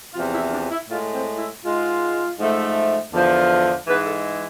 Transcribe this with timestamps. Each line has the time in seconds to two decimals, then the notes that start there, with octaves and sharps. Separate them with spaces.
0.14 E2 C3 F3 F4
0.33 E4
0.52 D4
0.71 E4
0.89 A2 F4
0.92 G#3
1.14 C4
1.38 E4
1.64 G#2 G#3 F4
2.39 G#2 F3 A3
3.13 E2 D3 F3
3.87 G#2 E3 G#3 B4
4.06 A4